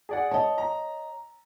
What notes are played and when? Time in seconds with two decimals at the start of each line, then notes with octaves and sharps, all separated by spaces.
0.09 G#4 D5 F#5
0.31 C#5 D#5 A5
0.58 A#5